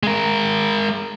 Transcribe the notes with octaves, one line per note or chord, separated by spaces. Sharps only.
G#3 A#4